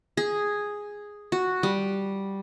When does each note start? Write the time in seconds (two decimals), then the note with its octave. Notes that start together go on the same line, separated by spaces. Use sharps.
0.17 G#4
1.32 F#4
1.63 G3